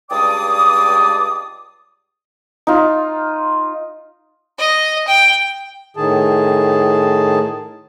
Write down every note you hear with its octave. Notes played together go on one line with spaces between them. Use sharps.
C#2 G2 D5 G5 D6 D#6
D#4 F4
D#5
G5
A2 D#3 G#4 A5